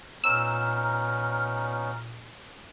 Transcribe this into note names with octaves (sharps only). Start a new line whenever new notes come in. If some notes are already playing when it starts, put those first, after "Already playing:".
A#2 B3 C#4 D#4 A#5 E6 F6